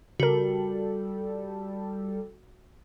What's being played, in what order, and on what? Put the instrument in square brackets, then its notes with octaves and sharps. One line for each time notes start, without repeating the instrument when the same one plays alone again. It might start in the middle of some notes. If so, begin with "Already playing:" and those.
[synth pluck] C#3 A#4 [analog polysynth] G3 A4 [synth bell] F#4